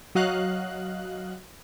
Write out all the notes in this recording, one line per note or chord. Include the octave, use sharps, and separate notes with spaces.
F#3 F#4 D#5 F5 F#6